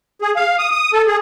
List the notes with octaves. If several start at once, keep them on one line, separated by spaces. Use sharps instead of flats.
G#4
F5
D#6
D#6
A4
G#4